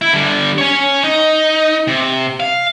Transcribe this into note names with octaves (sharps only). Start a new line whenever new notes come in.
E4
D3 G3
C#4 C#5
D#4
C3
F5